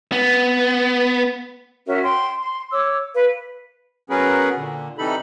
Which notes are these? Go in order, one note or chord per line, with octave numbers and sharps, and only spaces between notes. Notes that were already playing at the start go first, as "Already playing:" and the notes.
B3
C#4 F#4 A#4 E5
G5 C6
C6
C#5 D6 E6
B4 F5
F#3 B3 C#4 G#4 A#4 B4
A#2 D3
C3 E3 G3 D#4 A4 B5